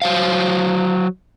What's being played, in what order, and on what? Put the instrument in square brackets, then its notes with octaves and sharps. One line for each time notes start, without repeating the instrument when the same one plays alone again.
[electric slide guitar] F#3 C5 F5